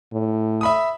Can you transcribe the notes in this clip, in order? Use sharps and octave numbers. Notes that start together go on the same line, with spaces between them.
A2
E5 B5 D#6